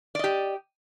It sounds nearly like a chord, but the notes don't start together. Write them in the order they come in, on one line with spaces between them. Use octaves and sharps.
D5 D#5 G4